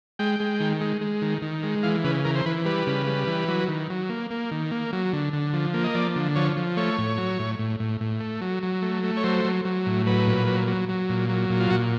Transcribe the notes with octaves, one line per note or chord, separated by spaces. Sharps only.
G#3 G5
G#3
D#3
G#3
G#3
D#3
D#3
G#3
E3 F5
C#3 B4
E3 A#4
C5
E3 B4
G3 B4
C#3
G3
E3
F#3
D#3
F#3
A#3
A#3
D#3
A#3
F#3
D3
D3
F3
A#3
D#5
F3 D5
D3
F3 C#5
F3
A3 C#5
A2
F#3
A2
A2
A2
A2
A3
F#3
F#3
A3
A3
C#5
F#3 C5
F#3
F#3
A2
F#3 B4
A#2
F#3
F#3
F#3
A#2
F#3
A#2
F4
A#2 F#4